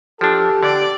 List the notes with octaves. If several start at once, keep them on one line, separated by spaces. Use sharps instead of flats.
F3 D4 G4 A4
D3 D5